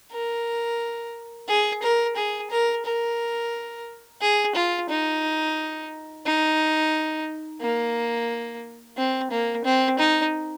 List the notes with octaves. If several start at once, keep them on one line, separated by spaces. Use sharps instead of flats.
A#4
G#4
A#4
G#4
A#4
A#4
G#4
F4
D#4
D#4
A#3
C4
A#3
C4
D#4